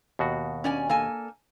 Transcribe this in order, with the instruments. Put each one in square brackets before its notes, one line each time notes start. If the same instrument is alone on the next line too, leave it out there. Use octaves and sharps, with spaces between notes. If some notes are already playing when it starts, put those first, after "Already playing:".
[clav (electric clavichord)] D#2 B2 F#4
[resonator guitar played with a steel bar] C#4 D5 G#5
A#3 A4 G#5